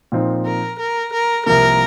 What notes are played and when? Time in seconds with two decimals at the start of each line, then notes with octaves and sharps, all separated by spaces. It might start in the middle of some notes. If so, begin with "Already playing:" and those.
0.12 A#2 F3 C4 D#4
0.46 A#4
0.79 A#4
1.13 A#4
1.46 C2 C3 F3 A#3 A#4